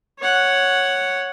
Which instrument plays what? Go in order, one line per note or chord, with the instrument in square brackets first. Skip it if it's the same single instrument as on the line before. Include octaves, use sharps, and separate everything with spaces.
[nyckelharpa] C#5 F#5